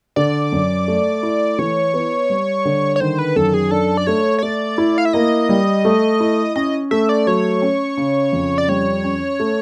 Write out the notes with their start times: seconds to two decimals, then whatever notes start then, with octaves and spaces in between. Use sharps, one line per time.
0.16 D3 D5
0.52 F#2
0.88 A3
1.23 E4
1.59 E3 C#5
1.94 B3
2.30 G3
2.65 D3
2.96 C#5
3.00 D#3 C5
3.19 B4
3.36 F#2 A4
3.54 G#4
3.71 D4 A4
3.97 D5
4.07 A3 C#5
4.39 C#5
4.43 A3 D5
4.78 E4
4.98 F5
5.05 E5
5.13 A#3 D#5
5.49 G3
5.85 A3
6.20 E4
6.56 C#4 D#5
6.91 A3 E5
7.09 D5
7.27 F#3 C#5
7.62 C#4
7.97 C#3
8.33 F2
8.58 D5
8.68 G3 C#5
9.04 C#4
9.40 A3